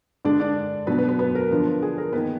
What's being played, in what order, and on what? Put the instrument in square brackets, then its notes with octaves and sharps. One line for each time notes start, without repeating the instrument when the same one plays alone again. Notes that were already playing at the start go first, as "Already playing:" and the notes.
[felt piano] D3 G#3 D4 D5
D4 D5
B2 F#3 B3 D4 B4
B3 B4
B3 B4
B3 B4
A#4
D3 F3 B3 D4
G#4
A#4
D#3 A#3 B3 D#4 B4